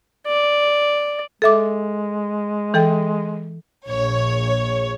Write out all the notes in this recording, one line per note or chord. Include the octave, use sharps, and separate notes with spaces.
D5
G#3 A4 E5 D6
E3 A4 G5
A#1 C#5